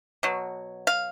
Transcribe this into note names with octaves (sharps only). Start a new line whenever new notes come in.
B2 F#3
F5